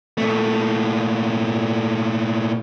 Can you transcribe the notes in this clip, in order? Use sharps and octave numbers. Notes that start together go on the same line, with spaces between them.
A#2 A3